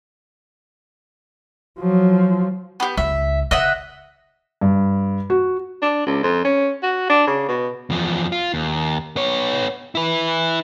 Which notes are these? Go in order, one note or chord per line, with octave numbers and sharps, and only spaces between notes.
F3 F#3
B3 G4
C#2 C#3 E5
C#3 D#5 E5 F#5
G2
F#4
D4
C#2
F2
C#4
F#4
D4
C#3
B2
E2 F3
F4
D#2
B3 C#5
E4 B4